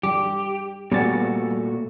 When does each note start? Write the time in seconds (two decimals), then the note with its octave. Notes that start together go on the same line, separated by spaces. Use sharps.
0.03 G3 G4
0.92 A#2 G3 A3 B3 F#4 G#5 A6